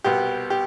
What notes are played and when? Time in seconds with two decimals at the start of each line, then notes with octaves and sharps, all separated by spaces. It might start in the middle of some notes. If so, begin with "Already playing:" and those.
0.04 C2 B2 B3 G4
0.50 G4